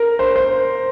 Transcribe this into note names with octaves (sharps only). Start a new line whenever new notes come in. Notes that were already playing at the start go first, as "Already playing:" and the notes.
Already playing: A#4
C5
C5